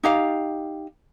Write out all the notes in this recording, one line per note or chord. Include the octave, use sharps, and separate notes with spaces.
D#4 G4 F5